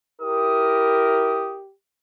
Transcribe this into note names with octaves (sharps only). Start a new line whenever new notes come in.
E4 G4 A#4 D#6